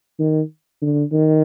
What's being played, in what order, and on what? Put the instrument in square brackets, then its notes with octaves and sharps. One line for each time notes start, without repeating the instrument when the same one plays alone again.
[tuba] D#3
D3
D#3